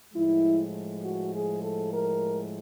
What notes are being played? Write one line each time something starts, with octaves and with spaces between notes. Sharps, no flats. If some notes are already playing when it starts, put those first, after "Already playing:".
A2 F3 G#3 E4
F#4
G#4
A4
A#4